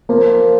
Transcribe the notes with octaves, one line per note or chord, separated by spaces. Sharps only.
F3 A#3